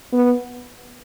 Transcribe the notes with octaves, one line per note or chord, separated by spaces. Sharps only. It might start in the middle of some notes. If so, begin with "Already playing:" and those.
B3